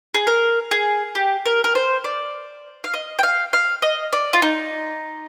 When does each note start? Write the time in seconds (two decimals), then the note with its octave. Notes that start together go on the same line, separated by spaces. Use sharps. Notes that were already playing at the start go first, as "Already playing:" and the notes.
0.14 G#4
0.27 A#4
0.71 G#4
1.15 G4
1.46 A#4
1.64 A#4
1.75 C5
2.04 D5
2.84 F5
2.94 D#5
3.19 G5
3.23 F5
3.53 F5
3.82 D#5
4.13 D5
4.33 F4
4.42 D#4